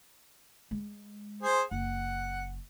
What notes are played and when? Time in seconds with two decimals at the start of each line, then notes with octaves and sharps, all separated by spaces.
0.71 G#3
1.43 G#4 C5
1.71 F#1 F#5